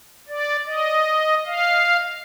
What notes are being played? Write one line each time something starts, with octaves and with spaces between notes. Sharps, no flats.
D5
D#5
F5